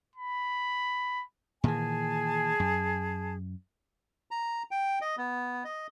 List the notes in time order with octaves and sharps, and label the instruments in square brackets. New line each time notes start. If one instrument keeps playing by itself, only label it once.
[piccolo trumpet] B5
[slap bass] A#2 D#3 E3 [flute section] G#4 G#5 A5
[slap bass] F#2
[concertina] A#5
G5
D#5
B3
D#5